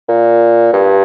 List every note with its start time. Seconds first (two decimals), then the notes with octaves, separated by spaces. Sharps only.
0.08 A#2
0.73 G2